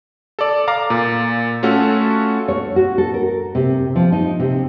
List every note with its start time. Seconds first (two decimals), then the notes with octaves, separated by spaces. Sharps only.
0.39 A4 D5
0.68 F5 A#5 D6
0.90 A#2
1.63 A3 C#4 F4 F#4 A4
2.48 C#5
2.76 F#4
2.98 A4
3.14 A#4
3.55 C3
3.96 F3
4.12 D#4
4.40 C3